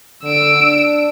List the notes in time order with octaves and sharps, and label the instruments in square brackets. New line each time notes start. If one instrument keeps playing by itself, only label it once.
[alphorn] D3 [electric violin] E6 D7
[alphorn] D4